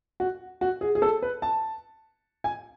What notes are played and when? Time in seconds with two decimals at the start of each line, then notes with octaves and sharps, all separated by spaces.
0.20 F#4
0.61 F#4
0.81 G#4
0.95 G#4
1.02 A4
1.22 B4
1.42 A5
2.44 G#5